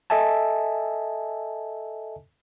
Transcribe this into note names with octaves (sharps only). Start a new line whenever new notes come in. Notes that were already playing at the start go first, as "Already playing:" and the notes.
A4 D#5 E5 G#5 A5